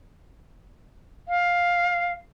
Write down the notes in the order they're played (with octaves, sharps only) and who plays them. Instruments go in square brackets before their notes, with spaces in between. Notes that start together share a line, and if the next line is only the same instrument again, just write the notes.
[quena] F5